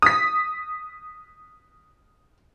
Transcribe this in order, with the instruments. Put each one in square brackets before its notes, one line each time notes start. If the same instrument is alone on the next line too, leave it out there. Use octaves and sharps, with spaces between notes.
[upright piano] D#6 B6